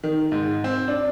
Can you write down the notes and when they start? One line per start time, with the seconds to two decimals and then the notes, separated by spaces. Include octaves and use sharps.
0.04 D#3
0.32 G#2
0.64 C4
0.88 D4